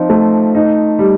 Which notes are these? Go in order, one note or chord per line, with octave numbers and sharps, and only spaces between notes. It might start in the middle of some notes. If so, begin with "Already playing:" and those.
Already playing: F3 C4 D#4
A3
D#4
G3